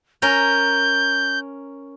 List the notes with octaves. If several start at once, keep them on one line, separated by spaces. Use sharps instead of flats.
C#4 A#4 G6